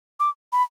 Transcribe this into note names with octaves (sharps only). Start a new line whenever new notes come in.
D6
B5